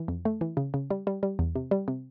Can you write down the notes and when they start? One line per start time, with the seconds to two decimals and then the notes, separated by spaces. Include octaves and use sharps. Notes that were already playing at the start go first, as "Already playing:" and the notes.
Already playing: E3
0.08 F2
0.25 A3
0.41 E3
0.57 C#3
0.74 C#3
0.90 G3
1.07 G3
1.23 G3
1.39 E2
1.55 C3
1.71 G3
1.88 C3